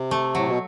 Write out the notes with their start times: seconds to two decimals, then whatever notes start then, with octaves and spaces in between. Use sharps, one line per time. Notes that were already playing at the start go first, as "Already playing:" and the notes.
Already playing: C3
0.11 A3
0.35 A2 F#3
0.48 B2